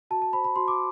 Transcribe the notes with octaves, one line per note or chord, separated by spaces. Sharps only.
F#4 A5
A5
C5 B5
B5
F#4 C6
D6